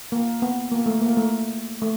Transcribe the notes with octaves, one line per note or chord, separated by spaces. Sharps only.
A#3
B3
A#3
A3
A#3
A3
A3